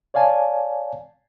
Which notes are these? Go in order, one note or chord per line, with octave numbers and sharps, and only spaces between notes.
C#5 D5 F5 G#5 A5